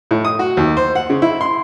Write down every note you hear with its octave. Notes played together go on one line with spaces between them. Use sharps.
A2
D#6
F#4
D#2
C5
F#5
C#3
E4
C6